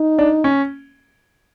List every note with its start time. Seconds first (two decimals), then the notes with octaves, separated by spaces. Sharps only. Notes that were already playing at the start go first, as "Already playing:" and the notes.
Already playing: D#4
0.19 D4
0.44 C#4